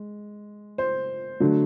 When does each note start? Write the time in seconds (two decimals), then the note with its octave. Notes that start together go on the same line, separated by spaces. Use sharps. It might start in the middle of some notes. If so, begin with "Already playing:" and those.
Already playing: G#3
0.78 C5
1.40 D3 F#3 A3 D4